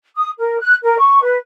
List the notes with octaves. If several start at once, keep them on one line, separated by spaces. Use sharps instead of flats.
D#6
A#4
F#6
A#4
C#6
B4